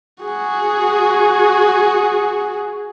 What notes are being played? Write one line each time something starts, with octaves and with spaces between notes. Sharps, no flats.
F#4 G#4